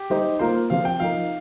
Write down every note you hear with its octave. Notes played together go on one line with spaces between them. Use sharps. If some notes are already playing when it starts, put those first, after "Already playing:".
Already playing: G4
G3 D#4 C5
A#3 F4 A#4 C5
C3 F3 C4 F4 C5 F5
G5
F3 D#4 A#4 F5